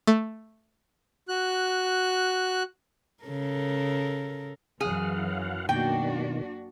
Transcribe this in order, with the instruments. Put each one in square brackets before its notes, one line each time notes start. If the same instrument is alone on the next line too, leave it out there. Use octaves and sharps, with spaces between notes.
[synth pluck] A3
[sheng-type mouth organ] F#4 F#6
[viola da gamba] C#3 A4 A#4
[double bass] F#2 F#3 [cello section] E3 [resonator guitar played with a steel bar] G#4 [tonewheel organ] F5 F#5
[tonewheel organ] B2 D#3 [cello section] A#3 D4 F#4 [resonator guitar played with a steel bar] G5